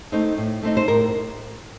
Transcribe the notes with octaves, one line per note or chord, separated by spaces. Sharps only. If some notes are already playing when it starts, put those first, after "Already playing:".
A3 C4 D#4
A2
A3 C4 D#4
C5
A2 A#4